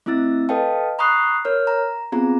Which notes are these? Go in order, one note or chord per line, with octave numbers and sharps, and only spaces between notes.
A3 C4 E4 E6 A6
A4 B4 D#5 F5 G5 A5
A#5 B5 C#6 D#6 F#6 C7
A#4 C#5 F6
A#5
B3 C4 F4 G#4 A#5